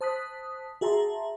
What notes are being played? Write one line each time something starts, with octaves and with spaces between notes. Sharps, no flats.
C5 A5 D#6 F#6 B6
F#4 G#4 E5 A5 A#5 C6